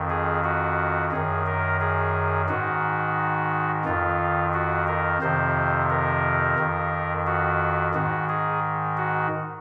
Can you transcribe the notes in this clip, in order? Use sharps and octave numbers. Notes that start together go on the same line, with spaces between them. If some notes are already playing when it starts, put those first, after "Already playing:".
Already playing: F2 D#3
G#4
F#4
F#2 D#3 G#4
A#4
G#4
G#2 D#3 F#4
F2 D#3 F4
F#4
A#4
F2 C3 D#3 C5
A#4
F2 D#3
F#4
G#2 D#3 F#4
G#4
F#4